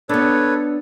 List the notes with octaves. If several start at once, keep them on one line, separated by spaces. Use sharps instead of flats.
B3 D4 A4 B4 C#5